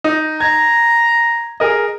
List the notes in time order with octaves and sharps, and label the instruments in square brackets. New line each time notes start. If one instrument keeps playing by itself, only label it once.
[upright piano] D#4
[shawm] A#5 [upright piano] G#6
[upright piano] G#4 A#4 D#5